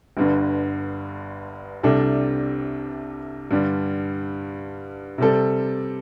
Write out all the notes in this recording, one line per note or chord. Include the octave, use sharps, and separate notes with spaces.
G1 G2 D3
C2 C3 G3 D4 A4
G2 D3 G3
C3 G3 C4 A4